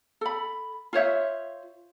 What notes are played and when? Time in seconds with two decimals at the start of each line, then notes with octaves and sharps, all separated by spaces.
0.21 A4 B5
0.93 F4 C5 C#5 E5